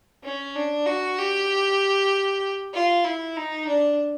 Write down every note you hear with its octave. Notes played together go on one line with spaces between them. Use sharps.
C#4
D4
F#4
G4
F4
E4
D#4
D4